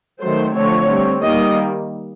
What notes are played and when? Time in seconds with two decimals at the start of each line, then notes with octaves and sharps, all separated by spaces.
0.21 D#3 F#3 A3 C5
0.54 D3 F3 A3 C4 C#5
0.89 G3 C4
1.23 D#3 G3 A#3 D#5